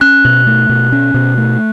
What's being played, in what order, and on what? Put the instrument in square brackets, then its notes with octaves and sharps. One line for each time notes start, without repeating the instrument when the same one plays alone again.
[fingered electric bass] C#4 [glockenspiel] F#6
[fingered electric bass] B2
A3
B2
C#4
B2
A3